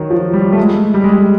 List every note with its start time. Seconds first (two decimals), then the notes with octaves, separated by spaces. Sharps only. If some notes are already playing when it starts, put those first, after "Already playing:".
Already playing: D#3 F#3
0.10 F3
0.33 G3
0.52 A3
0.57 G#3
0.94 G3
1.04 G#3